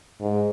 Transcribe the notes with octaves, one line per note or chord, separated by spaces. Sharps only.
G#2